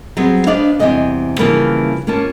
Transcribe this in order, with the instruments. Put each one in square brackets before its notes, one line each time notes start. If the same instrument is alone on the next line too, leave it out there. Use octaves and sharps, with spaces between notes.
[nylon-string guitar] F#3 G3 B3 C4 G#4
B3 D4 C5 D5 D#5 F5
E2 G2 C3 G3 D#5 G#5
C#3 E3 F3 G3 A#3 B4
A#3 B3 C#4 F4 A5